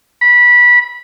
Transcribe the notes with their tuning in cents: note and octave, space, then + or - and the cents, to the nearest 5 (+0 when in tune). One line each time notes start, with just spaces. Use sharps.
B5 -20